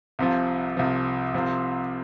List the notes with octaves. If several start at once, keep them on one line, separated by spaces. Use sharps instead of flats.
C2 C3 F3
C2 C3 F3
C2 C3 F3 C4